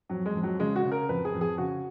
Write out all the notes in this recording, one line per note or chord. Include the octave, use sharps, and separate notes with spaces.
F2 F#3
G#3
F2
F#3
C#3 G#3
F#4
C#3
A#4
F2 B4
G#4
F2
G#4
C#3 F#4